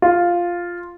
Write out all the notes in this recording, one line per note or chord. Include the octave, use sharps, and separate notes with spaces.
F4